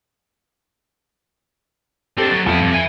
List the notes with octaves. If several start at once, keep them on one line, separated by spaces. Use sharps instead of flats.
C4 D4 G4 A4
F#2 A6
F2 B3 E4
G2 C3
E5 G#5